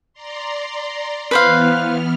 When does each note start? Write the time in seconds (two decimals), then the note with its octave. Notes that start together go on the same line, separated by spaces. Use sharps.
0.13 D5 A#5 C6
1.31 E3 B3 B4 C5 F5 F6